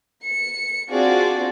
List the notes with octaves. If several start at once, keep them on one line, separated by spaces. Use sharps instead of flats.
C#7
C4 D4 F4 F#4 G#4 D5